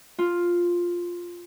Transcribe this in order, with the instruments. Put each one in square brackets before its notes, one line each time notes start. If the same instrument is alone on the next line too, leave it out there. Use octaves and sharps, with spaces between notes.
[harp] F4